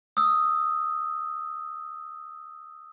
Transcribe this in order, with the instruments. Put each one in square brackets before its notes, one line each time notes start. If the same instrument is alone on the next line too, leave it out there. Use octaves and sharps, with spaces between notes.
[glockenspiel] D#6 E6